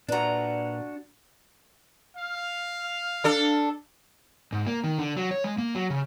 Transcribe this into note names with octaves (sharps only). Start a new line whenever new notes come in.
A#2 D4 F#4 B4 A#5
F5
D4 A4
G#2
A#3
D#3
D3
F#3
C#5
G#3
A#3
F#3
C#3